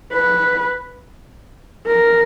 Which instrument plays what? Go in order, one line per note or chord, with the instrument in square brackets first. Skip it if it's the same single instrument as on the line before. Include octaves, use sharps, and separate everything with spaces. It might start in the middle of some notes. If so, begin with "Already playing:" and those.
[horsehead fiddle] B4
A#4